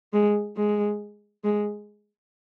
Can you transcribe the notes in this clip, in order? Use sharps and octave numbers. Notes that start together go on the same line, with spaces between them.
G#3
G#3
G#3